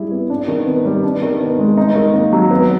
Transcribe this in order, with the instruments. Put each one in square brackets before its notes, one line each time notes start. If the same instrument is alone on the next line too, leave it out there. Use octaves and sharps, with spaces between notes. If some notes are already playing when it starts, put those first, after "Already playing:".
Already playing: [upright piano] G3 E4 G#4
B3
D4
D#3
B3
G3
D4
D#3
B3
G#3
D#4
D#3
A#3
F#3
B3